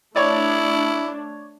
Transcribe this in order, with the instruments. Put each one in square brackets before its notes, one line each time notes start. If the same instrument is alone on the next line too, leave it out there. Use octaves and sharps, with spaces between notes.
[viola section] A3 D4 [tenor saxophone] E4 [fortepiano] C#5 D5